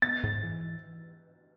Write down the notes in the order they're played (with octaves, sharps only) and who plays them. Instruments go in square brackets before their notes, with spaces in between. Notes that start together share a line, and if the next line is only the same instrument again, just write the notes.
[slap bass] B3 [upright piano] A6
[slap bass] G#2
E3